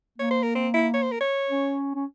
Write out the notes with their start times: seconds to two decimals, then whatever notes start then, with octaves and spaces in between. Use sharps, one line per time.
0.18 A#3 C#5
0.31 C5
0.43 A#4
0.55 C4
0.74 E4
0.94 C#5
1.02 C5
1.11 A#4
1.20 C#5
1.49 C#4
1.95 C#4